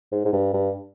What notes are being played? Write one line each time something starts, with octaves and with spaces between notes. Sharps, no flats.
G#2
G#2
G2
G2